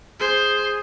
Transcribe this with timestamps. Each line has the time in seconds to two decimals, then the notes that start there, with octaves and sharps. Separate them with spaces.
0.20 G#4 C5